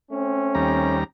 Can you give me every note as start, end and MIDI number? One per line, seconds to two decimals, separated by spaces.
0.11 0.98 57
0.11 0.98 60
0.11 0.98 61
0.55 1.04 39
0.55 1.04 55
0.55 1.04 82